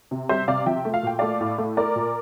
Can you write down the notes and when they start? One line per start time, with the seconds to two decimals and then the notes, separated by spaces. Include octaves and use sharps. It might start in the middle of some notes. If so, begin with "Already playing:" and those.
0.11 C3
0.29 G3 C5 E5
0.48 C3 D5 F5
0.66 F3 E5 G5
0.85 A3
0.94 F5
1.03 A#2 G5
1.19 A3 D5 F5
1.41 A2
1.58 A3
1.77 A3 A#4 D5
1.96 A#2